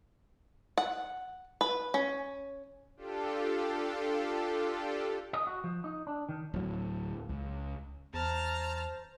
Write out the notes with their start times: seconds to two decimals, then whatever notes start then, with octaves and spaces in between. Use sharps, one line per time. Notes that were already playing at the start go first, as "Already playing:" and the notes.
0.78 F#5
1.61 B4
1.94 C#4
2.96 D4 F4 G4 A4
5.33 D#5
5.47 F#4
5.64 F3
5.84 D#4
6.07 D4
6.29 D#3
6.54 D1 F#3
7.29 C#2
8.14 E2 C5 A5 A#5 F6